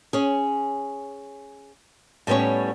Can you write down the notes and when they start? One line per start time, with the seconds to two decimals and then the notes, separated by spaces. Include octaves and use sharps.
0.13 C#4 G#4
2.27 A2 G3 B3 C#4 C#5